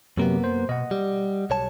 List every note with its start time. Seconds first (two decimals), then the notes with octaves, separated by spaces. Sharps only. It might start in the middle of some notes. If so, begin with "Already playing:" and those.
0.17 F#2 C3 F#3 A#3 B3
0.44 C5
0.69 B2 D#5 F#5
0.91 G3
1.50 B1 C#5 A5